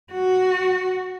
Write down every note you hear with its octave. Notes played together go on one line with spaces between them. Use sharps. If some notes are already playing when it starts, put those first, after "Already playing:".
F#4